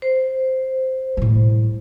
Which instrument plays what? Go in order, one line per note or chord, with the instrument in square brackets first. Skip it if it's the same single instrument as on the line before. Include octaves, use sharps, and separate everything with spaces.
[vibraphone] C5
[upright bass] A2 G3